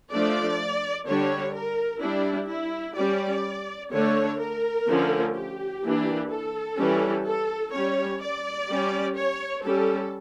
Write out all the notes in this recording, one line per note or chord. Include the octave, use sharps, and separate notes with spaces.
F3 A3 D4 D5
D3 G3 D4 C#5
A#4
G3 D4 E4
E4
G3 C#4 D5
D3 A3 D4 C#5
A#4
D3 F3 A3 C#4
G4
E3 A#3 D4
A4
E3 G3 C#4
A4
G3 C#4 C#5
D5
G3 C#4
C#5
G3 C#4 A4